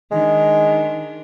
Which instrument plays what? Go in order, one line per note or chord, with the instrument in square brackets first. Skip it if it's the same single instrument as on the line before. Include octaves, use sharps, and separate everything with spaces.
[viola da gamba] D#3 D4 [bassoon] G#3